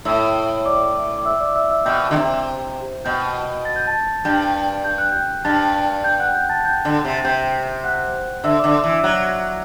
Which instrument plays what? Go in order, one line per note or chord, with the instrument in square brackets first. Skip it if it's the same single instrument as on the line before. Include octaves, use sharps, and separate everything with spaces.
[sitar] A2 [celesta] E5 E6
[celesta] D5 D6
D6
E5 E6
D5 D6
E5 E6
E5 E6
[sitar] B2 [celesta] G5 G6
[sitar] D3
C3
[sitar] B2 [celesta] G5 G6
[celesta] A6
G6
A5 A6
[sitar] G2 [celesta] G5 G6
[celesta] G6
F#6
G5 G6
[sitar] G2 [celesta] A5 A6
[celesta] G5 G6
F#5 F#6
G5 G6
A5 A6
G5 G6
[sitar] D3
C3
[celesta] A6
[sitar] C3 [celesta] G5 G6
[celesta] F#5 F#6
[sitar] D3 [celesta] E5 E6
[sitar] D3 [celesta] D5 D6
[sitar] E3
[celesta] E5 E6
[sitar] F#3 [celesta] F#5 F#6